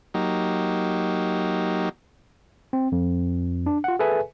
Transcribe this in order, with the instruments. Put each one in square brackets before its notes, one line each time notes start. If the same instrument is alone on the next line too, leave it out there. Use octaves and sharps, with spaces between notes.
[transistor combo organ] F#3 A#3 D#4 G4
[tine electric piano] C4
F2
D4
F4 F#5
G#4 A4 B4 E5 G#5